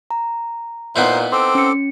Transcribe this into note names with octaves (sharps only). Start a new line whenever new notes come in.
A#5
A#2 B3 D#4 E4 C5 C6
C4 A4 C6 D6
C#4 C#7